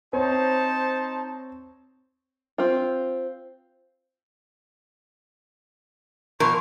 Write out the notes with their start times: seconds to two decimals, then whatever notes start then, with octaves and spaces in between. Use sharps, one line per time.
0.13 C4 D#4 C5 C#5 A5
2.58 C4 F4
6.40 B2 F3 A#4 C#6